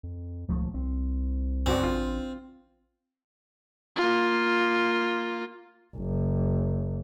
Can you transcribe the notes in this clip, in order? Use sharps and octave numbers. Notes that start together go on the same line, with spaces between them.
F2
D#1 C#2 F3 A3
C2 C4
C#2 F#2 C4 F#4 D5
A1 D4 F4
A#3 F4
F#1